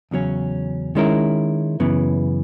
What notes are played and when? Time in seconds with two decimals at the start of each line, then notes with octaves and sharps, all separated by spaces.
0.11 E2 C#3 F#3 C#4
0.95 D#3 G#3 C#4 E4 A#4
1.80 F#2 C#3 E3 B3